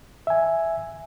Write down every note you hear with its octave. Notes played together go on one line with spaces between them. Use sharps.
E5 G#5